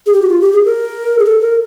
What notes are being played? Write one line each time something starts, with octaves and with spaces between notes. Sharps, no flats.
G#4
G4
F#4
F4
G4
G#4
A#4
G#4
A4
A#4